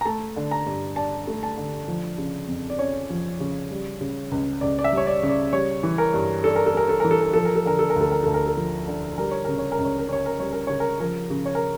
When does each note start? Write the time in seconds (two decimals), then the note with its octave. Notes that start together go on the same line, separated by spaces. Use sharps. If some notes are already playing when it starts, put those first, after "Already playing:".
0.01 A#5
0.05 A3 A5
0.36 D3
0.51 A#5
0.66 G2
0.96 D4 A5
1.27 A3
1.43 A5
1.58 D3
1.88 F3
2.18 C#3
2.48 F2
2.70 D5
2.79 C#4 C#5
3.10 F3
3.40 C#3
3.71 G3
4.01 C#3
4.32 C#2
4.61 C#2 D5
4.79 D5
4.84 E5
4.92 G3 C#5
5.07 D5
5.23 C#3
5.29 D5
5.53 G3 C#5
5.83 E3
5.98 A#4
6.14 G2
6.44 D4 A4
6.56 A#4
6.66 A4
6.74 G3 A#4
6.89 A4
7.00 E3 A#4
7.11 A4
7.22 A#4
7.33 F3 A4
7.45 A#4
7.55 A4
7.65 D3 A#4
7.79 A4
7.90 A#4
7.96 D2 A4
8.12 A#4
8.23 D2 A4
8.34 A#4
8.46 A4
8.57 F3
8.88 D3
9.18 G3 A#4
9.31 C#5
9.45 C#3 A#4
9.59 C#5
9.72 A#4
9.79 C#2
9.85 C#5
9.98 A#4
10.08 C#4 C#5
10.26 A#4
10.39 G3 C#5
10.53 A#4
10.67 C#3 C#5
10.80 A#4
11.00 F3 A#4
11.30 C#3
11.46 C#5
11.55 A#4